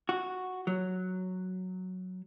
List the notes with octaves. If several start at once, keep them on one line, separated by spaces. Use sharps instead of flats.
F#4
F#3